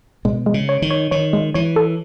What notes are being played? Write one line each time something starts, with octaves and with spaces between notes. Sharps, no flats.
B2 G#3
G#3
C#3
C#5
D#3
C#5
D#3 C#5
G#3
E3 C#5
A4